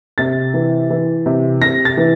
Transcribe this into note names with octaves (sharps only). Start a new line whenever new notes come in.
C3 A6
E3
E3
C3
C3 A#6
A6
E3